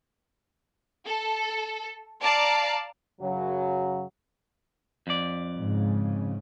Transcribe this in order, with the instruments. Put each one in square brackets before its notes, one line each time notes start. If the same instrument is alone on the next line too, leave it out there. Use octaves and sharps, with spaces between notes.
[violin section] A4
D5 F5 A5 A#5 D6
[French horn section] F#2 C#3 F#3
[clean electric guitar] F2 D5
[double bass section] G#2 C#3